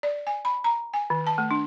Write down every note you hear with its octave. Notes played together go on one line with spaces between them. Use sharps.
D5
G#5
B5
A#5
G#5
D#3
A5
A3
D4